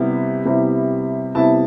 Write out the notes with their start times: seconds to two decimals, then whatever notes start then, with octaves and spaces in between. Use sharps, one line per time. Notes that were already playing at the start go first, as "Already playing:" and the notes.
Already playing: C3 G3 B3 E4
0.45 C3 G3 B3 E4
1.35 C3 G3 B3 E4 A5